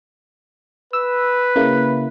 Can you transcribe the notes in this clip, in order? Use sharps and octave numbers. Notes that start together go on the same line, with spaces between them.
B4 E6
C#3 A#3 E4